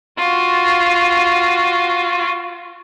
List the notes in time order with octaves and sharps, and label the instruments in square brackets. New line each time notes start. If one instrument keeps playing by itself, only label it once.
[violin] F4 F#4